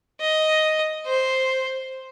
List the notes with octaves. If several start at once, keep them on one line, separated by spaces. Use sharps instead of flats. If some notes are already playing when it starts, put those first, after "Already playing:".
D#5
C5